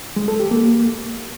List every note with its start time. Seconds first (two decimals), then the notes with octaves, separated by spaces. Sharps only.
0.16 G#3
0.28 A4
0.40 G4
0.51 A#3